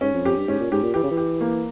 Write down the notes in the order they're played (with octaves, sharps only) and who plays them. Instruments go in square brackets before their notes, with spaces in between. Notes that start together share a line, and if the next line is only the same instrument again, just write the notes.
[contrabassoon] G#2 [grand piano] C#4
[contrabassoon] F2
[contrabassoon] F2 [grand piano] G4
[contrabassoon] G2
[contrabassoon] G#2 [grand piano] C#4
[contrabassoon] A#2
[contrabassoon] G#2 [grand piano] G4
[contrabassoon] A#2
[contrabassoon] E3 [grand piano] G4
[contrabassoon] C#3
E3
[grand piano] G4
A#3